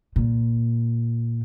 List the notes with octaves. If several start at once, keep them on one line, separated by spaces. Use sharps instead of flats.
A#2